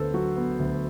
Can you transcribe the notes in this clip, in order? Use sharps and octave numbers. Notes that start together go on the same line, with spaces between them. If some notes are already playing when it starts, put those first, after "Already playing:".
Already playing: D2 D3 B3 A4 B4 C5
F#3 F#4
B3
D2